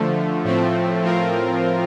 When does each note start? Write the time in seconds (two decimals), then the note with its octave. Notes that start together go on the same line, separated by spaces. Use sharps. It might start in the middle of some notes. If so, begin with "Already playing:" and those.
Already playing: D3 F3 A3
0.44 A2 F3 A3 C4
1.03 A2 F3 C4 F4 A#4